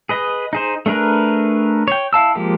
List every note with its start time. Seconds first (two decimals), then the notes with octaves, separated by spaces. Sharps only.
0.09 G#4 B4 D#5
0.53 D#4 G#4 C5
0.86 A3 D4 G#4 A#4 B4
1.88 C#5 G5
2.13 E4 F5 A5 E6
2.35 F3 G#3 A#3 G4